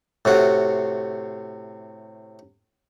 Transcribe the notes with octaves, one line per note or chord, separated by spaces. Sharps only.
A2 C3 F#4